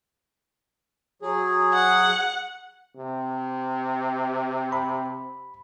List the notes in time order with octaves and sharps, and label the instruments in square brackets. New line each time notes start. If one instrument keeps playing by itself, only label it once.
[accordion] F#3 G#4
[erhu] F#5
[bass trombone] C3
[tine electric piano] B5